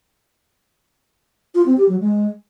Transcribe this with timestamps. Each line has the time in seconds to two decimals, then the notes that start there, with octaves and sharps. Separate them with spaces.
1.55 F4
1.66 C4
1.77 G4
1.89 F#3
2.00 G#3